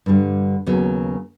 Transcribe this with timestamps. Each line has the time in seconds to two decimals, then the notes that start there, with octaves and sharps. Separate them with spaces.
0.06 G2 D3 G3
0.66 D#2 C#3 F#3 B3